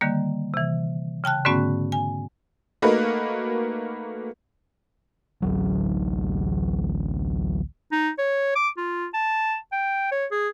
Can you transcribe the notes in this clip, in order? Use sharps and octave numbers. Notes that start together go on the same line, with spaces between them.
D3 D#3 G3 A#3
C3 E3
C#3 G5 A5 F#6
G#2 D3 A3 B3 C#4 F#4
G#5
A3 A#3 D#4 F#4 A#4 B4
A1 D2 F#3
D#4
C#5
D6
F4
A5
G5
C#5
G#4